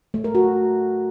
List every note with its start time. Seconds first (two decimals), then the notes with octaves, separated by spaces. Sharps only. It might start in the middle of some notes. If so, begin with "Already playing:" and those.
0.14 A3
0.24 A#4
0.35 F#4